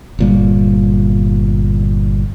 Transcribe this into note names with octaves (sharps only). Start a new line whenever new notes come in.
G1 A#2 G3